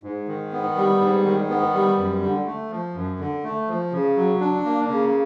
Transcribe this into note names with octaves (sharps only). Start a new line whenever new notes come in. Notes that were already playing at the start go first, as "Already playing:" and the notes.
G#2
D#3
B3
G3
G#2
D#3
B3
G3
F#2
D3
A3
F3
F#2
D3
A3
F3
C#3
F#3
D4
A#3
C#3